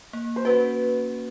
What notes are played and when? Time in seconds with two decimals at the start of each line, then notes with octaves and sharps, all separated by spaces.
0.13 A#3
0.36 C5
0.45 C#4 F#4 B4